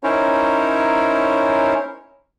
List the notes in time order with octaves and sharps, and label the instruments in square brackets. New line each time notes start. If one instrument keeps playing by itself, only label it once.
[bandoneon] C#4 D#4 E4 A#4 C5 C#5